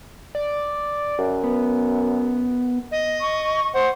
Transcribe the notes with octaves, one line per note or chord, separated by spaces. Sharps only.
D5
F#2
B3
D#5
C#6
C5 F#5